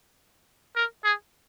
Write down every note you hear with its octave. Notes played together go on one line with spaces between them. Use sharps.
A#4
G#4